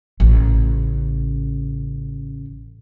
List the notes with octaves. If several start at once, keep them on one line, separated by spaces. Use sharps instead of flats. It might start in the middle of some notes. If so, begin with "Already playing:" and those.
A1 C#3